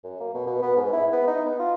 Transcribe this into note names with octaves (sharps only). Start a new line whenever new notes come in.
F#2
A#3
B2
B2
B3
G#2
E4
B3
D#4
B3
F4